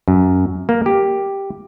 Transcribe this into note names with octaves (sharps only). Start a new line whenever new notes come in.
F#2
A#3
G4